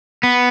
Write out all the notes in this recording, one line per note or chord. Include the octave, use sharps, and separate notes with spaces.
B3